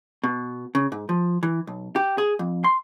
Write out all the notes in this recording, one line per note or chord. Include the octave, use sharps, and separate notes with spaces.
B2
C#3
G#2
F3
E3
B1
G4
G#4
F2
C6